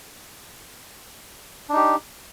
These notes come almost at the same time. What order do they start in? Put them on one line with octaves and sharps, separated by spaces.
D4 D#4 G4